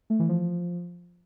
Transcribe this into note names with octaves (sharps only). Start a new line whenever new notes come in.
A3
E3
F3